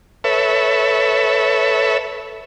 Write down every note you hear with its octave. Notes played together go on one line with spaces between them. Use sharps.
A4 B4 C#5 E5